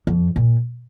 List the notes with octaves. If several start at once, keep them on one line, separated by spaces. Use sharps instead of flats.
F2
A#2